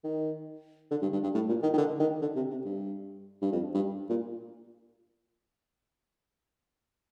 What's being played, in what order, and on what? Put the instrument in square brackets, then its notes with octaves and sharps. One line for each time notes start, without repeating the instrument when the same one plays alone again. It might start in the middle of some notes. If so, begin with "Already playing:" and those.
[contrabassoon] D#3
D3
G2
G2
G2
A2
A#2
D#3
D#3
D3
D#3
D3
C3
C3
G2
G2
F2
G2
A#2